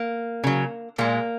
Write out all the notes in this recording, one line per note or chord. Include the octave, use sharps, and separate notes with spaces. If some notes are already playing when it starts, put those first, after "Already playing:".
Already playing: A#3
C#3 F#3
A#2 G#3 A#3